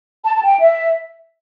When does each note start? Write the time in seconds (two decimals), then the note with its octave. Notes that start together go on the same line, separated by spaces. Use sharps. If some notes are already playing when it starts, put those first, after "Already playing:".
0.23 A5
0.35 A5
0.42 G5
0.60 E5